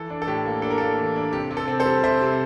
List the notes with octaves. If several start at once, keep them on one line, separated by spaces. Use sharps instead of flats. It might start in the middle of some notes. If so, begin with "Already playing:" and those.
Already playing: E3 A4
D4
A4
A2 G4
A#3
D4 A4
A#4
A#3 A4
E3
D4
C3 G4
C3
A4
C4
A4 C5
G3
C3 C5 E5
C3